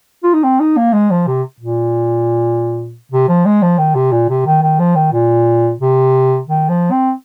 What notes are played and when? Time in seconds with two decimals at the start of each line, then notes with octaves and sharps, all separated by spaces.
0.23 F4
0.33 D#4
0.43 C4
0.60 D#4
0.77 A#3
0.93 G#3
1.10 F3
1.27 C3
1.60 A#2
3.12 C3
3.28 F3
3.45 G#3
3.62 F3
3.78 D#3
3.95 C3
4.12 A#2
4.29 C3
4.46 D#3
4.62 D#3
4.79 F3
4.95 D#3
5.13 A#2
5.80 C3
6.47 D#3
6.69 F3
6.91 C4